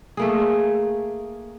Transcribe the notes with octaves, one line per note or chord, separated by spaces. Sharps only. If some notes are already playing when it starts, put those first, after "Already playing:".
A3 A#3 G#4